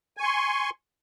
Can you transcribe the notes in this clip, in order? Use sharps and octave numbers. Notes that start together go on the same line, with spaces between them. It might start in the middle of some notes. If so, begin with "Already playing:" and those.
G#5 C6 C#6